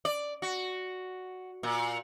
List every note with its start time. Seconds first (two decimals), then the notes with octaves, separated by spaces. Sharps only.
0.05 D5
0.42 F#4
1.63 A#2